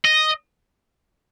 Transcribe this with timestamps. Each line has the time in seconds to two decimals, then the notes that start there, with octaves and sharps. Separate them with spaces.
0.05 D#5